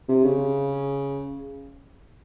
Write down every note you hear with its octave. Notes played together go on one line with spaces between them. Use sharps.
C3
C#3